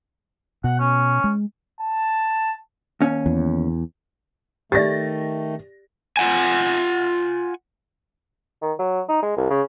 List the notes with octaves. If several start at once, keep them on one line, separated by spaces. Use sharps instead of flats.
B2 F#5
C#4
G#3
A5
D#2 C#4
E2
D#3 A3 G4 D5 A6 A#6
F4 F#5 G#5
D#3
F#3
D#4
G#3
C2
C#3